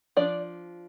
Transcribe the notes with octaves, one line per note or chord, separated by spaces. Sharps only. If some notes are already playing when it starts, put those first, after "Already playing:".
F3 D4 D5